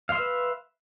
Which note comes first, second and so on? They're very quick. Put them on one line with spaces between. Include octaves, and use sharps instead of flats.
F5 C6 E5 B4